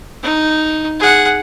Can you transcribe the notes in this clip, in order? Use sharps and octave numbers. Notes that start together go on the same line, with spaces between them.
D#4
G#4 F#5